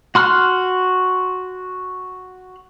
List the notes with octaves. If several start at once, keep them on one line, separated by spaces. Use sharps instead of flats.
F#4 C6 F6 F#6